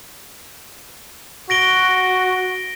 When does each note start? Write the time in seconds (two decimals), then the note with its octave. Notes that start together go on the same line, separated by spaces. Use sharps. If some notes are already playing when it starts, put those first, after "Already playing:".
1.50 F#4 A#6 D7 G7